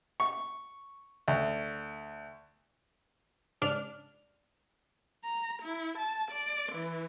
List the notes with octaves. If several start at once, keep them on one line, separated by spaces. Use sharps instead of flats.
C#6
D2
G#2 C#3 D4 F6
A#5
E4
A5
D5
E3